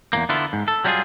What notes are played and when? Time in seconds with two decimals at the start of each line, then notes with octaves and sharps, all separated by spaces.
0.13 E2 G#2 A#3
0.29 D3 B3 E4 F4
0.53 G#2
0.68 A4
0.84 F#3 G3 C#4 E4 F4 G#4